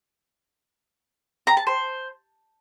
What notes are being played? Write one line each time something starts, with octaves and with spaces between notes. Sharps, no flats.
A#5
A5
C5